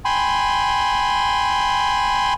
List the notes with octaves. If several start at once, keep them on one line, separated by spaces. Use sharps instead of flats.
G5 G#5 B5 C6